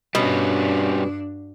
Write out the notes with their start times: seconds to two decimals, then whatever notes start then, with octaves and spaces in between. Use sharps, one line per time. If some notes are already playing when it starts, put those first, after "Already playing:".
0.15 G2 B2 G3 C#4 D4